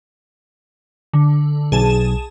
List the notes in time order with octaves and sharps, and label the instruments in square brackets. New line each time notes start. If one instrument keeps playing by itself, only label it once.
[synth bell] D3
[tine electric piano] B1 [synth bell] G#4 A5 E7